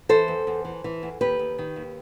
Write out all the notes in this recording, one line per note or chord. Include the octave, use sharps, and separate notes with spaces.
E3 A4 C5
E2
E2
E3
E3
E2
D#2 G4 B4
D#2
D#3
D#2